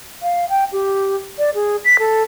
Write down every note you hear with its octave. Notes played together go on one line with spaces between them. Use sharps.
F5
G5
G4
D5
G#4
B6
A4